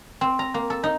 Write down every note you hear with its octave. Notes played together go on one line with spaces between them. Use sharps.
C4
A#5
A#3
A4
D#4